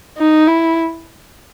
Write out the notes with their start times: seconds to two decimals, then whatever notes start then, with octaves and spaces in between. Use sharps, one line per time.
0.17 D#4
0.47 E4